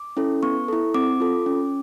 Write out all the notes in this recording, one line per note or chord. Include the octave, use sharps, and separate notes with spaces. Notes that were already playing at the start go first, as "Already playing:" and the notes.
Already playing: D6
C#4 E4 A4
B3 C#6
E4 A4
C4 D6
F4 A4
C#4